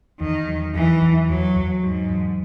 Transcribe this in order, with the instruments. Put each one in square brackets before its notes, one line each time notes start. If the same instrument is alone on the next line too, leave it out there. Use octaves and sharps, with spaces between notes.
[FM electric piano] E2 [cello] D#3
[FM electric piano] F#3
[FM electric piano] E2 [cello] E3
[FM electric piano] E2
[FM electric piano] E2 [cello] F#3
[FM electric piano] E2
[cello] G#2 [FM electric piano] F#3
[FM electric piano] E2